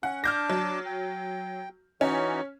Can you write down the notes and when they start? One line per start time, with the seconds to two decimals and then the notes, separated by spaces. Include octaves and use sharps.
0.03 C#4 F#5
0.24 D4 A5 D6 F6 G6 A#6
0.50 F#3
0.86 G5
2.01 E3 C#4 D#4 F#4